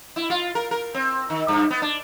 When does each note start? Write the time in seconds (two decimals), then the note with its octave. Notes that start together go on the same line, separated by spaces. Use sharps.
0.16 E4
0.30 F4
0.55 A#4
0.71 A#4
0.94 C4
1.30 D#3
1.48 G2
1.70 B3
1.82 D4